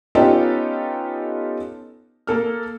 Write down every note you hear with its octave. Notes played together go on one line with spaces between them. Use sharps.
B3 C#4 D#4 F4 G4 A4
A#3 A4 F6